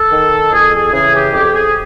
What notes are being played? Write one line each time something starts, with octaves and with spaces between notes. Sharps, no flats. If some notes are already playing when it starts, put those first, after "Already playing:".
Already playing: A4
D#3
F2 G#4
G#4
C#3 E3 G#4
G4
F2 G4
G#4